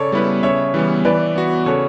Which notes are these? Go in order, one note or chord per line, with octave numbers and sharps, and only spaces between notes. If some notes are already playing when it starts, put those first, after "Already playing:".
Already playing: C#3 A4 C#5 D5
G3 B3 E4 B4
C#3 C#5 E5
E3 G3 B3
E3 B4 D5
B3 F#4
C#3 A4 C#5